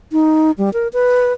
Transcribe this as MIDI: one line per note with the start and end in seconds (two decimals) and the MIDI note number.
0.12 0.51 63
0.58 0.73 55
0.73 0.88 70
0.93 1.33 71